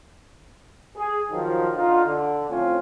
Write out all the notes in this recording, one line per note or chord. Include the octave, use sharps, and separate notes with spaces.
G#4
D#3 F3 F#3
D3 D#4 F4
D3
A2 F3 A3 C4 C#4 F4